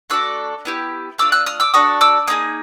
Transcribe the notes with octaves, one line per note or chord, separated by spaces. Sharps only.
A3 D4 F#4 A4 D6 E6
B3 E4 G4
A3 D4 F4 D6 E6
E6 F#6
D#6 F6
D6 E6
D4 F#4 A4 C#6 D#6
D6 E6
A#3 D#4 G#4 D#6